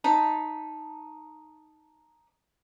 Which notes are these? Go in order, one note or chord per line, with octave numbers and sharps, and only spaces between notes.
D#4 A5 B5